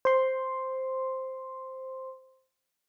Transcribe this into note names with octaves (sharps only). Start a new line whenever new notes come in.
C5 C6